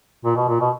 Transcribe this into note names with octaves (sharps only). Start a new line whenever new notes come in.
A#2
B2
A#2
B2